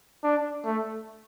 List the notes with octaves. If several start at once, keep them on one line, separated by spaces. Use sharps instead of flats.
D4
A3